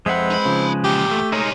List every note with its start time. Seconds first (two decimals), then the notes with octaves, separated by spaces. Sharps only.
0.06 F2 G#3 C4 B4 E5 F#5
0.31 D#4 B5
0.45 C#3 F3
0.84 E2 A#2 G4
1.12 A3
1.32 C3 G#3 C#4 D#4 A#4